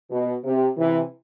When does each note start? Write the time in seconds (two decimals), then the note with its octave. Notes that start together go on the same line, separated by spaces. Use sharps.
0.11 B2
0.44 C3
0.77 C3 E3